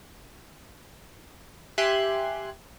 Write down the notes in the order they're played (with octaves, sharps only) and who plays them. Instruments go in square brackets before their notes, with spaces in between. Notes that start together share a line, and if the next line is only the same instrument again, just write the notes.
[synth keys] G4 E5 G#5 C6 F#6